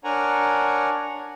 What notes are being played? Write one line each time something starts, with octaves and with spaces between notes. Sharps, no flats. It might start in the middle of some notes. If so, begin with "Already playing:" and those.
D4 A#4 C#5 F#5 G#5 A#5